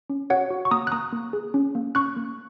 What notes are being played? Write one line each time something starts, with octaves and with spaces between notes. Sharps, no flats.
C#4
F#4 C#5 F#5
F#4
C#6
A#3 A#5 D#6
F#6
A#3 A#5 D#6
A#3
G#4
C#4
A#3
C#4 C#6 F#6
A#3